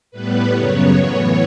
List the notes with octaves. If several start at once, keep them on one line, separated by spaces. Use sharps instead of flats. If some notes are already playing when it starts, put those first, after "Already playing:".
A2 G3 B3 B4
F#2 C#3 F#3 B3 C#5
A2 E3 B3 C#5